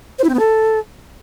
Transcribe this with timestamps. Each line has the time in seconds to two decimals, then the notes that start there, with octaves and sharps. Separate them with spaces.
0.18 C5
0.24 E4
0.29 C4
0.34 B3
0.39 A4